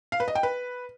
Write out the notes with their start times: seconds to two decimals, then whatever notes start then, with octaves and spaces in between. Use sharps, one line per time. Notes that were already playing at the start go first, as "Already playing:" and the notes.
0.12 F5
0.20 B4
0.28 D#5
0.35 G5
0.43 B4